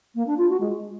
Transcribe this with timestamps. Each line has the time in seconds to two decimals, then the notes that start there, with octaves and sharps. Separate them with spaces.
0.15 A#3
0.26 D4
0.38 F4
0.49 F#4
0.60 G#3